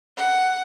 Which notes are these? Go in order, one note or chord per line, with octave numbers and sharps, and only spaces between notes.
F#5